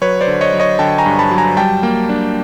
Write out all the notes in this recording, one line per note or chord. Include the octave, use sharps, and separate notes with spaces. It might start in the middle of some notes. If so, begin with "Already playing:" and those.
F#3 B4 C#5
C5 D5
D3
C#5 D#5
F#3
C#5 D#5
D3 G5 A5
G#5 A#5
G2
A5 B5
F#3
G#5 A#5
G3 G5 A5
A#3
D4